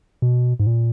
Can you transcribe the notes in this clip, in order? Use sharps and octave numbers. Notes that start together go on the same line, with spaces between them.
B2
G#2
A#2